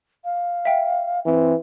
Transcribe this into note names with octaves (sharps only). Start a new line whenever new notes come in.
F5
E5 G5
E3 C4